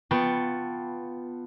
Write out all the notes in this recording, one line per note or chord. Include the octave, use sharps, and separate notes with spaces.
B3 F4 G5 A5 C#6